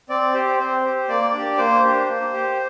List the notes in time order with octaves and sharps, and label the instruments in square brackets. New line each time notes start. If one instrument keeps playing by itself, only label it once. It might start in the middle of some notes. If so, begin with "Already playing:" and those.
[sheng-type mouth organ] C4 D5
G4 C5
C4 C5
G4
A#3 D5
D4 G4
A#3 C5
D4 G4
A#3
G4